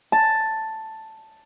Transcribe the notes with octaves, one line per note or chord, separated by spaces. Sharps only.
A5